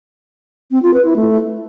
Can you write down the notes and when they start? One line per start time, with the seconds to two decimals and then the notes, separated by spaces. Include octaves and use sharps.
0.71 C4
0.82 F4
0.94 B4
1.05 E4
1.16 A3